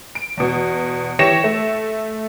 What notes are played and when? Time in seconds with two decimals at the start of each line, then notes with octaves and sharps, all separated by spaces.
0.15 D7
0.37 E2 B2
1.19 E3 G4 C#5 A#6 C#7 E7
1.44 A3